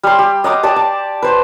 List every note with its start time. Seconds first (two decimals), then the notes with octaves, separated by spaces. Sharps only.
0.03 G3 C6
0.19 G4
0.44 D#5 F#5 D6 D#6
0.63 G4 D5 A5
0.76 A5
1.22 B4 C5